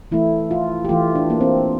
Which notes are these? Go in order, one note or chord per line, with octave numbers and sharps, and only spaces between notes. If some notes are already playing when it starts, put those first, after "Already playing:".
E3 A3 E4
F4
G4
E3 A3 F4
D4
A#3
C4